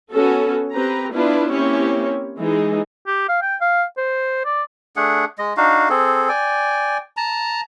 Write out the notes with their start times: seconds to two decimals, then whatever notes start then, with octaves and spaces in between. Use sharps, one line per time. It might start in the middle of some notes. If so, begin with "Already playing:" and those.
0.11 B3 C#4 F#4 A4
0.72 C4 G4 B4 A#5
1.13 B3 D4 E4 F4 B4
1.50 A#3 C4 C#4 E4 G4 C#5
2.40 E3 G#3 D#4 G#4
3.07 G4
3.29 F5
3.42 G5
3.61 F5
3.98 C5
4.45 D5
4.96 A3 D4 G#4 F#5
5.39 G#3 D#5
5.57 D4 D#4 F#4 F5
5.90 C4 G#4 A4
6.29 D5 G5 G#5
7.17 A5 A#5